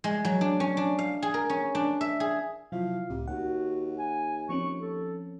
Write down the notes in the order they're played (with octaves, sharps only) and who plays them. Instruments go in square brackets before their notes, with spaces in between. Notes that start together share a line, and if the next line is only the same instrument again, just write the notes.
[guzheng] G#3
F#3
D4
C#4
D4
F5
G#4
A#4
C#4
D4
E5
G#4
[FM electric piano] C3 F#3 E4 [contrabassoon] F3 [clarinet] F5
[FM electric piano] C#2 A2 [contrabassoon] C3
[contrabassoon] D#2 [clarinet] F#4 [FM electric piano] F#5
[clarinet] G#5
[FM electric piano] F3 C4 C#4 [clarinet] C#6
[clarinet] A4